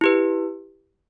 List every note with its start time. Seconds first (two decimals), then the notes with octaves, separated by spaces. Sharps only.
0.01 E4 G4 B4